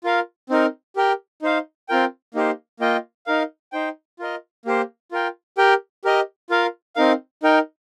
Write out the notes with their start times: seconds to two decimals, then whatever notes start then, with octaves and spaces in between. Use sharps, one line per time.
0.04 F4 A#4 F5
0.50 C4 D#4 A#4
0.96 G4 A#4 G5
1.42 D#4 C5 F5
1.89 C4 F4 A#4 G5
2.34 A#3 D#4 G4 C5
2.80 A#3 F4 D#5 G5
3.27 D#4 A#4 F5
3.73 D#4 C5 G5
4.19 F4 A#4 D#5
4.65 A#3 G4 C5
5.12 F4 A#4 G5
5.58 G4 A#4 G5
6.05 G4 A#4 D#5
6.50 F4 A#4 F5
6.96 C4 D#4 A#4 F5
7.43 D#4 A#4 G5